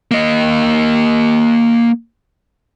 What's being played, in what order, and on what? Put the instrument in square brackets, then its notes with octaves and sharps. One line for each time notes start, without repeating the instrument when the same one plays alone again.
[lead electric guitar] A#3 D#5